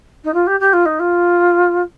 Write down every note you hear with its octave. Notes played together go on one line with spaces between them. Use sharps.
D#4
F4
G4
G4
F4
D#4
F4